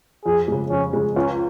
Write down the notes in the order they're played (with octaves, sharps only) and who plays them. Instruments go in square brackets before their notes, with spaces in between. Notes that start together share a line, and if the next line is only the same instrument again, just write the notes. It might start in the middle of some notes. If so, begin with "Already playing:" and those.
[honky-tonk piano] F2 [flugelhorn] G#4
[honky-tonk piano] C#3 G#3
[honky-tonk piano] F2 [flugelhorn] C#4
[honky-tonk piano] C#3 G#3
[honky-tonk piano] C#2 [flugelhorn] C#4